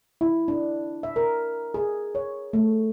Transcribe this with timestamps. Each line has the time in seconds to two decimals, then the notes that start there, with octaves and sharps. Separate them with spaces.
0.21 E4
0.48 D4
1.03 E5
1.16 A#4
1.74 G#4
2.15 C#5
2.53 A3